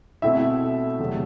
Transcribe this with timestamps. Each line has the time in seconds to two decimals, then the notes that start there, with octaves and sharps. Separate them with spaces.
0.22 B2 A3 C4 E4 E5
1.00 E2 C3 F#3 A3